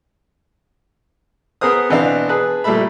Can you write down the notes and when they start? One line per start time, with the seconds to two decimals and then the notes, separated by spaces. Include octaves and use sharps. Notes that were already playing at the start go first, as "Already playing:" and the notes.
1.61 B3 G#4 A#4 C5 D#6
1.90 B2 E3 B3 C4 D4 F5
2.29 G#4 B4 A5
2.64 A#2 G3 A3 A4 E5 B5